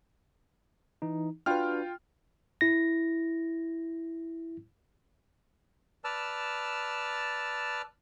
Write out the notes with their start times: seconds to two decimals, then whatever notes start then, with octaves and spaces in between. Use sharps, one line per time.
1.02 E3 D#4
1.46 D4 F4 F#4 B4 G5 F6
2.61 E4 A#6
6.04 B4 D5 A5 E6 F6